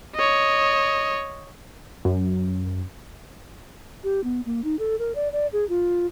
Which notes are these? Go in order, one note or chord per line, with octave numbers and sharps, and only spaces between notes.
C#5 D#5
F#2
G4
B3
A#3
D#4
A4
A#4
D5
D5
G#4
F4